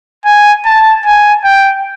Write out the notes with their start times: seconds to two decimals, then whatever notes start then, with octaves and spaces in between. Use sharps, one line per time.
0.25 G#5
0.65 A5
1.05 G#5
1.44 G5